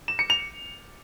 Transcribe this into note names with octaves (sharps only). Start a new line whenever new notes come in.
E7
C#7
F7